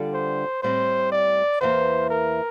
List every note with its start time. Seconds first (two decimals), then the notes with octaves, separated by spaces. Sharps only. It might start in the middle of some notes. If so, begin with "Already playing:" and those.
Already playing: D3 G3 D4 F4 A4
0.13 C5
0.63 A2 G3 C4 C5
1.12 D5
1.61 E2 E3 A#3 C5
2.10 A#4